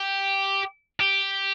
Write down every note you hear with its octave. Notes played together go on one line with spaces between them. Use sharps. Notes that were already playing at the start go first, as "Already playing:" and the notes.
Already playing: G4
G4